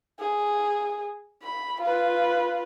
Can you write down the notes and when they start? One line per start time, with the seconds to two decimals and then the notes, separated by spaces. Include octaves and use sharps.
0.20 G#4
1.43 B5
1.81 F4 B4